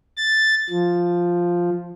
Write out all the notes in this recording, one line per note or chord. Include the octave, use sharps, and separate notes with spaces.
A6
F3